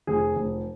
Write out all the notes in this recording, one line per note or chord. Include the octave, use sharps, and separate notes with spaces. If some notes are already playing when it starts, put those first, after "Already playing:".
F1 G#4
F1